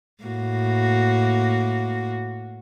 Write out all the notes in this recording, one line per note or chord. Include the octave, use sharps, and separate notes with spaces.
A2 A#3 F#4